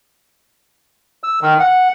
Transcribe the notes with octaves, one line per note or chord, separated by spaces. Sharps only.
E6
D#3
F#5